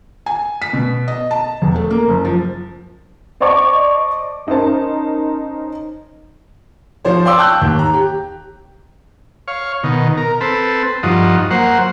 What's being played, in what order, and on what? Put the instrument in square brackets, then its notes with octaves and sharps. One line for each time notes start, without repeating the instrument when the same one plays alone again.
[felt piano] G#5
B6
B2
D#5
A5
E1
A3
A#3
F#1
F3
[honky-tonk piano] C5 D5 D#5 A5 C#6 D6
C#4 D#4 A#4 C5 A5
[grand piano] F3 C5 C#5
D5 F5 G5 C6 D6 E6
G5 A5 C#6 E6 F#6 G6
D#2
A#5
G4
[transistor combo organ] C#5 F5
B2 D#3
A#4
C4 A4 B4
G2 F3 D#4 F#4
F#3 A#3 C5 F#5